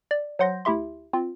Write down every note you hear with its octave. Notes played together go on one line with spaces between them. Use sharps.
D5
F#3 C5 F#5 C6 G6 A#6
D2 E4 G4 E5 C6
C4 F4